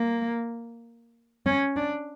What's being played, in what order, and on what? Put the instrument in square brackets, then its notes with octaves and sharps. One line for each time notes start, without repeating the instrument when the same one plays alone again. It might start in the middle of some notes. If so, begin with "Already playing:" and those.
Already playing: [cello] A#3
C#4
D4